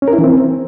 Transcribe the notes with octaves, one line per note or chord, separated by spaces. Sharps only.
C#4
A#4
E4
E3
C4